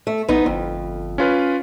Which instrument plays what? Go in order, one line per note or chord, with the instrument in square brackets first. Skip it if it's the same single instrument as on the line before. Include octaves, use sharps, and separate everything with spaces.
[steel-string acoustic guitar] A3
[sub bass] B1 [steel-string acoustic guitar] B3 D#4
[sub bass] G1 [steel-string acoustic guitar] F2
[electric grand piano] C#4 F4 B4